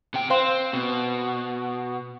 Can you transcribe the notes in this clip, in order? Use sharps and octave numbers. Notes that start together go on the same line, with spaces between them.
C3 G5
C4 C5 F5 C6
B2